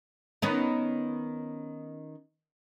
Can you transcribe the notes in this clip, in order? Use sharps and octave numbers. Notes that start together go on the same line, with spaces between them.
D#3 B3 C#4